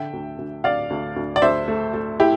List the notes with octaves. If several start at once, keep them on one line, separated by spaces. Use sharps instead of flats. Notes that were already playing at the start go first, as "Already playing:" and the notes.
Already playing: D3 E5 G5
D2
D2
D2 D5 F5
D2
D2
D5
D2 C5 E5
A3
A3
E4 G4